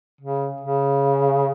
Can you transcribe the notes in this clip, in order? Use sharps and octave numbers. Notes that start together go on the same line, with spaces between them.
C#3
C#3